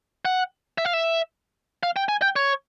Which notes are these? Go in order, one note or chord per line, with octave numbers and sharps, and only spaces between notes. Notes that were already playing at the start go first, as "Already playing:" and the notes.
F#5
E5
F5
E5
F5
G5
G#5
G5
C#5